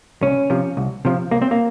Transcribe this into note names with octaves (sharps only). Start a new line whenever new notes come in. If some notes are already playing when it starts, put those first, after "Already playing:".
C2 C#4
C3 F3
C2
C3 F3
C2 A#3
C4
A#3